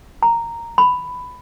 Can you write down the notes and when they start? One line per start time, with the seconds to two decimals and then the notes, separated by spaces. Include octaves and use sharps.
0.23 A#5
0.78 B5